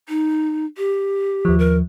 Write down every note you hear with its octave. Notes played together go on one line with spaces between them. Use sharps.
D#4
G4
D#2 F3
A#4